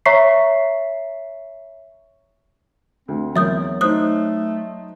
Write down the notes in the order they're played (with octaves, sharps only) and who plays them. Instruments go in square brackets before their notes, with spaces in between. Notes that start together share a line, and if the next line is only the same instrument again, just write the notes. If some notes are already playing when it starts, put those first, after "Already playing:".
[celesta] C#5 E5 A#5 C#6 B6 C7
[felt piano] D2 [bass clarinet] C4
[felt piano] E2 A#4 [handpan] F#3 [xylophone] E5 D#6 G6
[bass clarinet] A3 [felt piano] D#4 C5 [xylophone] D#6 F#6